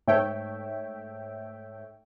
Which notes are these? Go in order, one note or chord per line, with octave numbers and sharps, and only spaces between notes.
G#2 A3 C#5 E5 G5